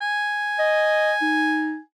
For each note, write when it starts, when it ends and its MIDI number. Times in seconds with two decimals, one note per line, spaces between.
0.02 1.82 80
0.59 1.13 75
1.21 1.78 63